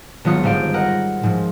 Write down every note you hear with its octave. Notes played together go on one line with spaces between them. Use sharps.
G#1 F#3 B3 F4 D#6 C#7
G1 G#2 C5 F5 D7
A#4 D#5 F#5
G#2 F3